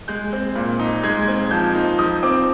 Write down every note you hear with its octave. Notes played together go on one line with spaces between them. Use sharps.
G#3 G6
C4
A#2
D#4
G#3 G#6
C4 G#6
F3 G6
D#4
F3 D#6
C4 D6